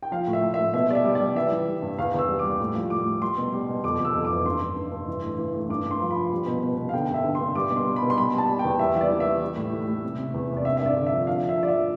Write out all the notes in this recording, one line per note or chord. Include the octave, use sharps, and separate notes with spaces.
G5
F3 F5
A2
E5
F3
E5
A2
B2 E5
G3 D5
E5
G3
D5
G3
E3 E5
E3
G3
G2
E2 F5
E2 E6
G3
D6
G3
A2
F3
A2 D6
A2
G3 C6
B2
G3
B2
F2 D6
F2
E6
F2
D6
E3
G2 C6
G2
G2
G2
E3
A2
E3
A2
G2 D6
G2
C6
F3
B5
F3
G3
B2
B2
B2
F5
D3 G5
G2 E5
D3
C6
G2
G3 D6
B2
C6
G3
B5
B2
C6
G3 B5
G3
A5
G3
G5
E2
G3 E5
E3 E5
D5
E3
E5
E3
G3
A2
A2
A2
C3
C3
E2
C3
D5
G2 E5
E5
G2 D5
D3
E5
F3
F3 F5
F3
E5
F3 D5
E5
F3